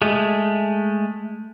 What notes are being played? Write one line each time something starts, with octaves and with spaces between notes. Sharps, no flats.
G#3 A3